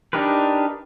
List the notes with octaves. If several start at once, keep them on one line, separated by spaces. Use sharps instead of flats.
D4 D#4 G4 A#4 B4